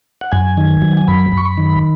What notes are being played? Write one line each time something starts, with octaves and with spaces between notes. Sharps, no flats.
F#5
F#2 G#5
D#3
F#3
G#5
F#2 B5
F#2
C#6
B5
D#3